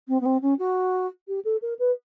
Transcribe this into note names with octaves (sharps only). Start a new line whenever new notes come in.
C4
B3
C4
C#4
F#4
G4
A4
A#4
B4